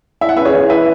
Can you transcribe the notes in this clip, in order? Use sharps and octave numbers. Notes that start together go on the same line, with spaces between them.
E4 E5
F#5
C#4 B4 E5
G#4 C#5
E3
E4 B4 E5